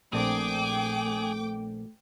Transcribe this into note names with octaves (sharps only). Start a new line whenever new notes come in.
A#1 A3 C4 D4 G#4 G5 D6